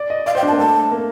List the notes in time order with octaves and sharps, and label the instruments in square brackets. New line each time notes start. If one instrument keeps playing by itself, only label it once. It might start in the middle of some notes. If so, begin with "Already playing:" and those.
Already playing: [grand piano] D5
D#5
[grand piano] D5 [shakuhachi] F5
[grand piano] C5 [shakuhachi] G5
[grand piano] D4
[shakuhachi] A5
[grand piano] A#3
[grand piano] A3 [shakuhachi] A5
[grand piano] A#3